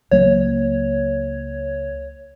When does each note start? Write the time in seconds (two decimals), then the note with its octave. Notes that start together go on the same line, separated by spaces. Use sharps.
0.11 C#2 F#3 A#3 C#5